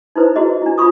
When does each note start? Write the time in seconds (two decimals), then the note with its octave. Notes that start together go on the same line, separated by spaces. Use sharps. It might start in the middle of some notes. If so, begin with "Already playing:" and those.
0.16 D#4 E4 B4 C5
0.36 E4 F#4 G#4 D#5
0.62 D4 E4
0.78 F4 B5 C#6 D#6